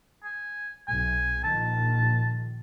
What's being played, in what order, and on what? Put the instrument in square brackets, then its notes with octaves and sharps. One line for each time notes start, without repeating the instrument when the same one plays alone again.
[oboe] G#5
[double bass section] B1 [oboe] G#5
[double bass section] A#1 D#3 [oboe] A5